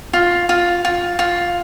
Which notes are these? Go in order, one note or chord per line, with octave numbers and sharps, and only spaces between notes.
F4
F4
F4
F4